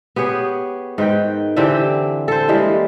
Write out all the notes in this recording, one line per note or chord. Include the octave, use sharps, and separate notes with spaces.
B3 G4 G#4 C#5
G#2 D#3 B4 G5
D3 E3 C4 G4
A4 C5
E3 G3 G#3 A#3